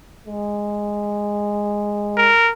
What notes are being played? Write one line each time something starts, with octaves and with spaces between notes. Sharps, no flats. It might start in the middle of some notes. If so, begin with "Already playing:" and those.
G#3
A#4